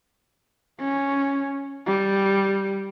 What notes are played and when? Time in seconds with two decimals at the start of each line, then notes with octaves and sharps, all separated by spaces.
0.81 C#4
1.87 G3